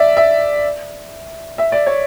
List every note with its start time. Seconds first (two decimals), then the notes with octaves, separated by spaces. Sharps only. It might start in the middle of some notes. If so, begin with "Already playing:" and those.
Already playing: D5 E5
0.17 E5
1.58 E5
1.72 D5
1.86 C#5